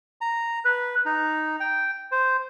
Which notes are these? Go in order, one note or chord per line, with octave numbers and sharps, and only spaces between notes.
A#5
B4
D#4
G5
C5